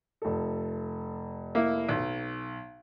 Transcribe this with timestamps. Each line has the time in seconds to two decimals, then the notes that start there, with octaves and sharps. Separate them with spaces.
0.22 F1 A4
1.55 A#3 E4
1.89 B1